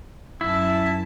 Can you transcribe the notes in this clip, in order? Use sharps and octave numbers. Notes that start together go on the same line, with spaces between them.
F#2 E4 A5